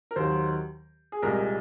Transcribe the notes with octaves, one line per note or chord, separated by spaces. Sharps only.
A#4
D#2 D#3 F#3 C5
G#4
C2 A#2 G#3 A#4